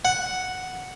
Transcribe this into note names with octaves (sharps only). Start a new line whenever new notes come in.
F#5